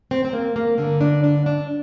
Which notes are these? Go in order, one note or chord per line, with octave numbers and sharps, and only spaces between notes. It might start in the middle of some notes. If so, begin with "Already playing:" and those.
C4
C4
A#3
A#3
G2 D3 A#3
D4
D4
D4